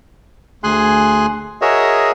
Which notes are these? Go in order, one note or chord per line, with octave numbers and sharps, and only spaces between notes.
D2 G#4 G#5 C6 F#6
F#4 G#4 A#4 C#5 D#5 E5